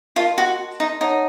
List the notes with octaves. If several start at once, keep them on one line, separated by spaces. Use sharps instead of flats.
F4 A#4 D#5 A5 C6
F#4
D#4
D#4 C#5 F#5 A5